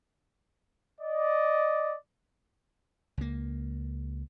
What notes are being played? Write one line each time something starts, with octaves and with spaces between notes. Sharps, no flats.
D5 D#5
C#2 A#3